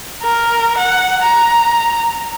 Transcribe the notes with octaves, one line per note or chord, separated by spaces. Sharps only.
A#4
F#5
A#5